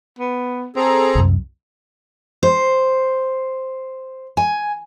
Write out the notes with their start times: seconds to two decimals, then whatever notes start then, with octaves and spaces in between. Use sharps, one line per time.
0.19 B3
0.76 C4 G#4 A4 A#5
1.15 C2 F#2
2.43 C5
4.37 G#5